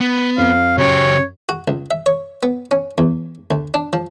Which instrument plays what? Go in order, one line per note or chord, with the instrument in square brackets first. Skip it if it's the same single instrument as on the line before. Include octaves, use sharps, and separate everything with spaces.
[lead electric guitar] B3
[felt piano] F2 [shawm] F5
[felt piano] F#2 [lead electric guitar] C#3 G4 [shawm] C#5
[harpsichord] F#4
C#2
E5
C#5
B3
C#4
E2
D2
D4
F3